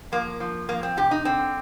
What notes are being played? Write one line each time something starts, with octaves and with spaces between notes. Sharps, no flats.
F3 A#3
F3
F2 A#3
C4
C3 G4
D#4
D3 C4